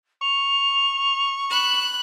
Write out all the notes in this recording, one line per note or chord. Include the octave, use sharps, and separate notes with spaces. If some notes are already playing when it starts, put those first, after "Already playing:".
C#6 F7
B5 F#6 E7